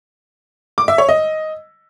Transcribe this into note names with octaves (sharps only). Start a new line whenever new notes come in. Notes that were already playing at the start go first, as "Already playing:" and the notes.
D6
E5
C#5
D#5